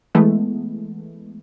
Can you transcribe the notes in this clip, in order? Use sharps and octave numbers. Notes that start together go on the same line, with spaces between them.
E3 G#3 A3 B3